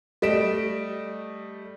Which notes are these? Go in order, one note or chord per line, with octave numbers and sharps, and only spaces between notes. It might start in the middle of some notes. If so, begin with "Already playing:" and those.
G3 A3 D#5 B6 D7 E7